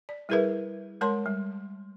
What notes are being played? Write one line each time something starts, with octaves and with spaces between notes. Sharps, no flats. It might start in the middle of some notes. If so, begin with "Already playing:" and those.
D5
G3 E4 G#4 A#4 B4 E5
G#3 A#4 C#5 A5 C6
G3